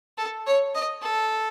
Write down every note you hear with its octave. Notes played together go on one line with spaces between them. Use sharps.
A4
C#5
D#5
A4